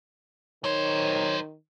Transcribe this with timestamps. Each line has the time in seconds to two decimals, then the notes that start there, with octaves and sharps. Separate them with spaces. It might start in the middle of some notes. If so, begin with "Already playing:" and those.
0.64 D#3 F#3 C5 C#5